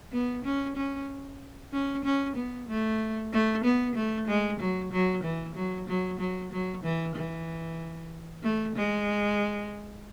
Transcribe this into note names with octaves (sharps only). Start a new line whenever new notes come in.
B3
C#4
C#4
C#4
C#4
B3
A3
A3
B3
A3
G#3
F#3
F#3
E3
F#3
F#3
F#3
F#3
E3
E3
A3
G#3